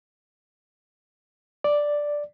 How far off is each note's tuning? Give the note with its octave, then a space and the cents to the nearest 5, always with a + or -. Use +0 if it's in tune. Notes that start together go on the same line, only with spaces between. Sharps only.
D5 +0